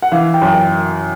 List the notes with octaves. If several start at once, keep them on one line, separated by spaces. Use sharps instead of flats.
F#5
E3 F5
G5
F#2
G5